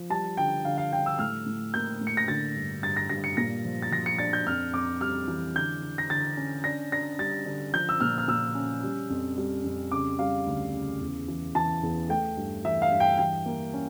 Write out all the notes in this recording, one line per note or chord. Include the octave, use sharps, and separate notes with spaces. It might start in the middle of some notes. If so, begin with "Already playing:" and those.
Already playing: F3
G3 A5
D3 G5
D3 F5
F5
G3 G5
E6
A2 F6
A2
A#3 G6
A2
C#7
A#6
D3 A6
G2
G2 A6
A#6
G2 A#6
C#7
A#2 A#6
F3
A6
F3 A#6
C#7
D4 A6
G6
F2 F6
F2 D6
G3 F6
E3
D3 G6
D3
A#6
D3 A6
C#4
D4 A#6
D4 A#6
G3 A6
D3
F3 G6
E6
A#2 F6
F6
A#2 E6
C#4
G3
F2
G3
F2
C#3 D6
G3 F5
D2
C#3
E2
E3
E3 A5
E2
A3 G5
G2
E3 E5
F5
G2
G5
E3 G5
A#3
C#4